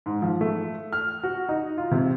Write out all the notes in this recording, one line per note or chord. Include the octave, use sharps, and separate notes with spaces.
G#2
F3
A3
F6
F#4
D#4
F4
C3